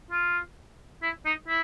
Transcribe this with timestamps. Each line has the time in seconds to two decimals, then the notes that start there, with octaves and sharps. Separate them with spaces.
0.11 F4
1.02 E4
1.25 D#4
1.48 E4